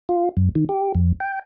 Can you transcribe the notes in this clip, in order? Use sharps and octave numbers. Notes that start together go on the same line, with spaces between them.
F4
F#2
D#3
G4
F2
G5